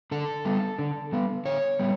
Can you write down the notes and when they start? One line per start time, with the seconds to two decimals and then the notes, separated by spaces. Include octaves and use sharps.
0.11 D3 A4
0.45 G3 B3
0.79 D3
1.12 G3 B3
1.45 D3 C#5
1.79 G3 B3